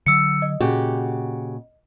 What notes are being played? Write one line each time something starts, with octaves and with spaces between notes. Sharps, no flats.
D3 F#3 E6 C#7
D#5
A#2 C#3 F#4 G4